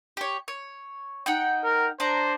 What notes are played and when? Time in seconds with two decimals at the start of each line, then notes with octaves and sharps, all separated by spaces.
0.17 G4 C#5
0.48 C#5
1.26 D#4 F#5 G5
1.64 A#4
2.00 D4 C5 A#5